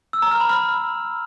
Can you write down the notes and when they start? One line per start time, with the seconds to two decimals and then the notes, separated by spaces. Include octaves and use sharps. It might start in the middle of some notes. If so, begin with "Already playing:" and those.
0.13 E6
0.22 A#5
0.31 F6
0.40 B5
0.50 F6